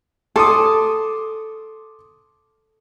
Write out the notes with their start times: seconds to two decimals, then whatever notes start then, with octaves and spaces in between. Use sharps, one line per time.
0.36 A4 C6 D6 D#6